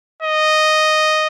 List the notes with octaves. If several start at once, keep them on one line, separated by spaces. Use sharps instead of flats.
D#5